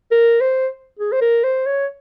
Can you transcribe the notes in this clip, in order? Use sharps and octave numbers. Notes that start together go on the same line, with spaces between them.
A#4
C5
G#4
C5
A#4
C5
C#5